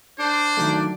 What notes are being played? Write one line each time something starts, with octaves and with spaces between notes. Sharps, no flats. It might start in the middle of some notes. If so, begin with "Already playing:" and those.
D4 C5
D#3 F#3 A3